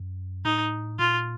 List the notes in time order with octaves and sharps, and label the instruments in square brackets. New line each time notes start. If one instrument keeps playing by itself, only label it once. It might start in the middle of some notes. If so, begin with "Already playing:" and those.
Already playing: [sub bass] F#2
[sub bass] A2 [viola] D#4
[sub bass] A#2 [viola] F4